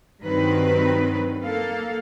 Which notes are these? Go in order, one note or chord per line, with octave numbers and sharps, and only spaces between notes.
G2 D#3 F#3 C4 B4
A#3 A4 F5